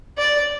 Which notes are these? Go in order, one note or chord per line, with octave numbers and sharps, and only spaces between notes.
D5